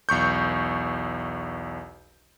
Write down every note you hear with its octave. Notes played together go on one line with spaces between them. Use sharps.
B1 E2 C#6 G6